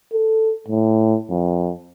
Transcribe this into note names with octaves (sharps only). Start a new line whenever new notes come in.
A4
A2
F2